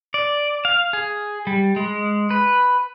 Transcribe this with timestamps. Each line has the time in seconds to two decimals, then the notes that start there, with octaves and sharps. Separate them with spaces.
0.14 D5
0.65 F5
0.93 G#4
1.47 G3
1.76 G#3
2.30 B4